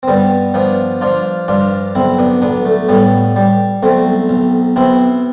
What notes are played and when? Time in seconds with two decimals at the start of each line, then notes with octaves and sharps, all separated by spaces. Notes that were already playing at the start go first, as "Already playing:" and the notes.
0.03 C4
0.08 G2 G3 B3
0.54 F3 B3 D4
1.01 F3 D4 F4
1.48 G2 D4 F4
1.95 B1 C4 E4
2.19 B3 D4
2.42 B1 B3 D4
2.65 A3
2.88 A2 G3 B3
3.36 G3
3.83 B1 A3 C4
4.29 B1
4.76 B2 C4 E4